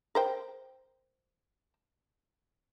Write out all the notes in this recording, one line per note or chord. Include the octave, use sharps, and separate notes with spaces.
A#4 C5 G5